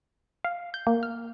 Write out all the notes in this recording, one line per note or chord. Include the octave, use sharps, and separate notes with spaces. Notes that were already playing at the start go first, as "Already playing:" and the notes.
F5
G6
A#3
F6